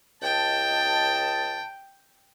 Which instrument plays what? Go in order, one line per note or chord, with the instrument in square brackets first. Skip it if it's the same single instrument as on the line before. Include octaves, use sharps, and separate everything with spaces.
[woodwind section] C#2 D#5 A5 [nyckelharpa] G5